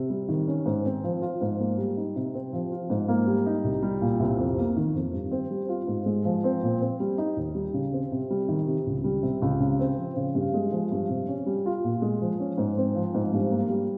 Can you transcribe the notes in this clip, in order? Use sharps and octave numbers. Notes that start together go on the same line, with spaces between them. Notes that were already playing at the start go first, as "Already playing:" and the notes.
Already playing: C3
G3
D#3
C#4
G#2
C4
F3
F4
G#2
A#3
G3
D#4
C3
C4
F3
F4
G#2
A#3
G3
D#4
C2
G3
A#2
C2
F2
A#3
D#3
F2
G2
C4
G3
F4
G#2
G#3
F3
C4
A#2
C4
G3
D#4
D#2
G3
C#3
C4
C3
G3
D#3
C3
C#2
G3
C3
C#2
C#3
C4
F3
C#3
G2
G#3
F3
G2
C3
C#4
G3
F4
A#2
G#3
F3
C#4
G#2
C4
F3
G#2
G2
A#3
G3